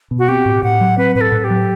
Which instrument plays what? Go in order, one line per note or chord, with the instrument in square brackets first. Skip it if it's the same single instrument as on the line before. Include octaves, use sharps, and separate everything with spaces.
[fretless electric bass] B2
[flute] F#4
[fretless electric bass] C4 [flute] G4
[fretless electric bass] A2
[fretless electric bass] A2 [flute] F#5
[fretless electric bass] F#3
[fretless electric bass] C4 [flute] B4
[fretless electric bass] A2 [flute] B4
[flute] A4
[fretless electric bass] A2
[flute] G4
[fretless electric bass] F#3